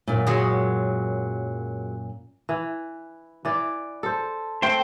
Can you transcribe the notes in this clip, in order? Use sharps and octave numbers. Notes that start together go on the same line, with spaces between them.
F#2 A#2
F#3 G#3
E3
E3 D5
A4 C5
A3 C4 C5 G5